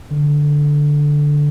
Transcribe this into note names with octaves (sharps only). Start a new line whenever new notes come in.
D3